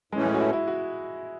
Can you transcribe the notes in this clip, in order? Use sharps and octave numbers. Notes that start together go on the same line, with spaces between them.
A2 E3 G#3 A3 C#4
G#3
F#4
E4
E4
F#4